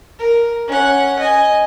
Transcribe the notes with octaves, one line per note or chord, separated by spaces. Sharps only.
A#4
C#4 F#5
D#5 G#5